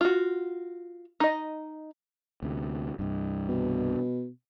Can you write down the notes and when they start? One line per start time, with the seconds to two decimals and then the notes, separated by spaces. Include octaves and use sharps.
0.01 F4 F#4
1.20 D#4 D#5
2.43 D2 C3
2.99 C2 G2
3.49 B2